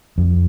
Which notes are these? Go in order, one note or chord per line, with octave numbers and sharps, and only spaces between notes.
F2